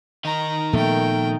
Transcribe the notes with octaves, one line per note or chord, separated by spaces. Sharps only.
D#3 D#4 A#5
A#2 F3 A3 B3 A#4 G5